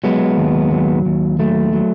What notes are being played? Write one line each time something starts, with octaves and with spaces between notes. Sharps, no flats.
F#3 G#3 B3
D#2
F#3
D#2
F#3 A3
F#3